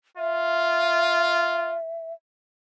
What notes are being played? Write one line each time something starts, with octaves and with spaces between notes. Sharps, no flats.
F4 E5